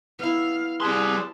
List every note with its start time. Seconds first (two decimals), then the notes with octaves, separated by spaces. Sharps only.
0.19 B3 E4 F5
0.80 G3 G#4 B4 A5 C6